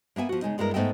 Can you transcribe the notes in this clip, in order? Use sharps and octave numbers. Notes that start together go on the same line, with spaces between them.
A#3 B3 E5 G#5
F3 F#4
C#3 G#3 D#4
G2 G#3 B3 E4 A#4
G#2 A3 B3 D#5 E5 G5